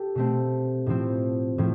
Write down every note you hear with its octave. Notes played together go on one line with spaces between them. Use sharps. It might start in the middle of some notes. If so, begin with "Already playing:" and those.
Already playing: G4 A4
B2 A3 C4
A2 F3 C4
A2 F3